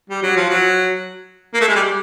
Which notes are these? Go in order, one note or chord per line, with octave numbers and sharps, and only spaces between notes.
G3
F#3
F3
F#3
A#3
A3
G#3
G3